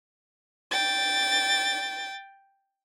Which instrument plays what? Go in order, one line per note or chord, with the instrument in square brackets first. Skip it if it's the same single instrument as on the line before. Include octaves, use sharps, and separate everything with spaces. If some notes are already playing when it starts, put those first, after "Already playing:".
[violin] G5 A6